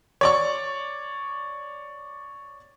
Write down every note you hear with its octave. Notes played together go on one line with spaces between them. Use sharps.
C#5 D5 C#6